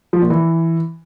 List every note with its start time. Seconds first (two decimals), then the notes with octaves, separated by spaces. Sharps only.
0.13 F3
0.22 A#2
0.30 E3